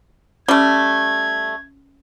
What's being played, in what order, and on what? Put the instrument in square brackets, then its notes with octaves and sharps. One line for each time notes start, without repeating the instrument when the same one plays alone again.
[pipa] G3 A3 [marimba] C#4 [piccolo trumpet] G#6